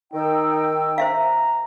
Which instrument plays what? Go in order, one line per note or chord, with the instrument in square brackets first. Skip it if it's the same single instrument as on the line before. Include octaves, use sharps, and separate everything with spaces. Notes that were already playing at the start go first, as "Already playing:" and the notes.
[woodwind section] D#3 [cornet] D#4 [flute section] G5 E6
[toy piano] C5 E5 F5 [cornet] A#5